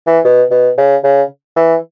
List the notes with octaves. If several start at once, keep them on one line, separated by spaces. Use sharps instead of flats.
E3
B2
B2
C#3
C#3
E3